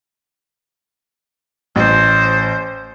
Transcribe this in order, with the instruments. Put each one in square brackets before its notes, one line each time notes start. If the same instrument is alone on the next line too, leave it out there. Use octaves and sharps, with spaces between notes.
[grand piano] A1 [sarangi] C5